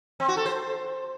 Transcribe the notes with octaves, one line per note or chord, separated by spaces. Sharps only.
C4
F#4
A4
C5